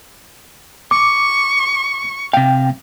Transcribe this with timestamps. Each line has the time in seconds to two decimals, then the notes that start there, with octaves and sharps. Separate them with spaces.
0.91 C#6 D6
2.33 C3 F5 G5